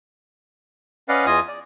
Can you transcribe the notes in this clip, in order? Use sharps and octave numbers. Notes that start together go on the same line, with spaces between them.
C#4 B4 D5 D#5 F5 F#5
E2 E3 F4 D#5 G#5 D#6
D5